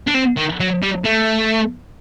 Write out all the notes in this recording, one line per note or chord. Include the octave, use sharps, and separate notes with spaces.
D4
C4
D#3
F#3
G3
A3